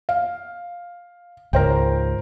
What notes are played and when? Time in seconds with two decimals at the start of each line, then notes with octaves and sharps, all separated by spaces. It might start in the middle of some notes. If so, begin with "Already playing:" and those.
0.09 F5
1.53 C#2 G#2 A#4 C5 G5